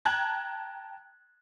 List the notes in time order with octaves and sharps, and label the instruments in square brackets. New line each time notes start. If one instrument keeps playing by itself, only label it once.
[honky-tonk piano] G5 A5 A#5 F#6 G#6 F#7